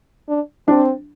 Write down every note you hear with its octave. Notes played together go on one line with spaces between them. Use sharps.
D4
C4 D4